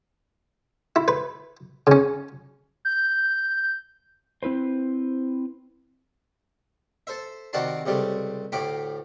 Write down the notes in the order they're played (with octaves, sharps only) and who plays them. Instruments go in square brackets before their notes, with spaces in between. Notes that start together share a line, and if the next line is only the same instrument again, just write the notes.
[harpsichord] E4
B4
C#3 C#4
[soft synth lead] G6
[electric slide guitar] C4 E4 B4 C5
[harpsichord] A4 C5 E5
C3 D#3 F#4 D5 A5 C6
C#2 C3 G3 A3
D2 A2 G4 F5 G5 B5